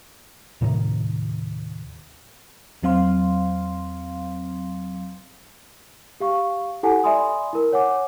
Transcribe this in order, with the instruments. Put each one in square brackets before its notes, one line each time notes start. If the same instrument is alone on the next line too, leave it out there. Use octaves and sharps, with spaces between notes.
[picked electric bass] D#2 A2 C3 D#3
[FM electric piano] E2 F#3 C4 F5 C6
[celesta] G4 F5 C#6
E4 G4 A4 F#5 G#5
D5 E5 G#5 B5 C6 D#6
E4 A#4
C#5 F#5 G#5 D6